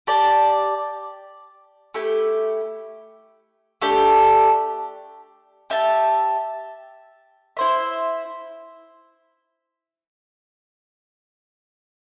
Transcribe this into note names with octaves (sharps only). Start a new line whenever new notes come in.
G4 D5 A5
A3 E4 G4
A3 D4 G4
G4 E5 A5
E4 C5 E5